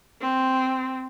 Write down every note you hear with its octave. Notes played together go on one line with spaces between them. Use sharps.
C4